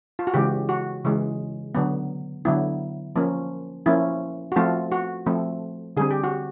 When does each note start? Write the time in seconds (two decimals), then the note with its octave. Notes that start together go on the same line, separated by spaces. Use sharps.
0.19 F4
0.27 F#4
0.34 C#3 E3 G#3 G4
0.69 F#4
1.04 C#3 E3 G#3
1.75 D3 F#3 B3
2.45 D3 F#3 B3 E4
3.16 F3 A#3 C#4
3.86 F3 A#3 C#4 E4
4.52 F#4
4.56 F3 A3 C4 F4
4.92 F#4
5.26 F3 A3 C4
5.97 D3 G3 C4 G#4
6.10 G4
6.24 F#4